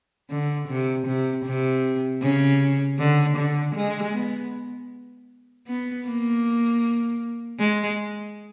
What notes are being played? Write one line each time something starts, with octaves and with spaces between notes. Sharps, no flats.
D3
C3
C3
C3
C#3
D3
D3
G#3
B3
B3
A#3
G#3